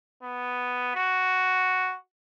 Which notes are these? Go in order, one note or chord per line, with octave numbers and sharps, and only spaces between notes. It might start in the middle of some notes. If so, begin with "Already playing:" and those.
B3
F#4